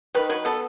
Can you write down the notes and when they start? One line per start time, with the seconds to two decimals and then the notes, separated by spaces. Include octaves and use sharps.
0.15 D#3 B4
0.30 F#3 B4
0.45 B3 A4